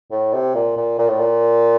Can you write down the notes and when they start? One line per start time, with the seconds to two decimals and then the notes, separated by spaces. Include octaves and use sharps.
0.11 A2
0.33 C3
0.55 A#2
0.77 A#2
0.99 A#2
1.08 A2
1.19 A#2